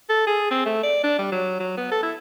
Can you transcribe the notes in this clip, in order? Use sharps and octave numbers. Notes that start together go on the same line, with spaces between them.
A4
G#4
C4
A3
D5
D4
G3
F#3
F#3
B3
A4
E4